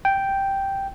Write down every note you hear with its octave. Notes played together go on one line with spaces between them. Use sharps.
G5